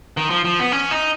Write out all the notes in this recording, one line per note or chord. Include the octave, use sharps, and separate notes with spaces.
D#3
F3
F3
B3
C#4
D#4